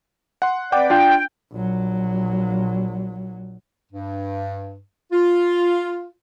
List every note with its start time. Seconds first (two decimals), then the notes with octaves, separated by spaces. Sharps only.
0.42 F#5 C6
0.72 C4 B4 D5 F#5 G5 D6
0.90 D4 F4 G5
1.53 A#1 F#3
3.92 G2
5.12 F4